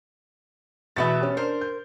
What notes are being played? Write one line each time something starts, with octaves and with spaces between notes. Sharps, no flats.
E2 B2 A3 B3 E5 A6
C#4 G4
D4 A#4 C5
G6